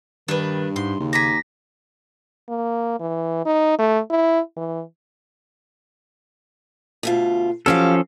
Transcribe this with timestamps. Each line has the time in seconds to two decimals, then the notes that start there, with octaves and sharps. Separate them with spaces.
0.28 G2 D#3 D4 B4
0.76 G#2 C6
1.00 D#2 C#3
1.13 G#5 A#5 D6 A#6 B6
2.49 A#3
3.00 E3
3.46 D#4
3.79 A3
4.10 E4
4.56 E3
7.03 D2 B2 F4
7.66 F3 F#3 C#4 G4 A4 F5